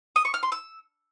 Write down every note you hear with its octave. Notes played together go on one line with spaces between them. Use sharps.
D#6
C#6
F6
C6
E6